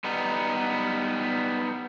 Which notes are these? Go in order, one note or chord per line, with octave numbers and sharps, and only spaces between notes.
G3 B3 D#4